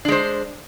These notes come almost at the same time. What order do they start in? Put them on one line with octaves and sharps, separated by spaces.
D4 G#3 C5